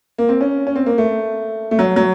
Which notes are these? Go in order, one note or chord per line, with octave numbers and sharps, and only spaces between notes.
A#3
C4
C#4
C#4
C4
A#3
A3
A3
F#3
F#3